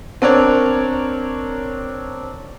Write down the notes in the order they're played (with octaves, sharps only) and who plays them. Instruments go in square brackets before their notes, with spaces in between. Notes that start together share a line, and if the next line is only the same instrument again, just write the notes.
[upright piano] C4 D4 A#4 C#5